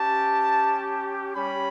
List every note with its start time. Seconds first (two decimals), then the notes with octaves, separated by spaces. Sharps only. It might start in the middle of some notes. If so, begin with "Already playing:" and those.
Already playing: C#4 G4 A5
1.36 G3 C#4 G4 B5